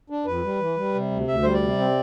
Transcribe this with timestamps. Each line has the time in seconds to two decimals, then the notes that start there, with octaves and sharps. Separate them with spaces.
0.10 D4
0.26 F2 B4
0.44 G3
0.60 E3
0.77 G3
0.94 C3
1.11 D2
1.27 D2 E5
1.43 G3 C5
1.54 D5
1.62 C3
1.78 C4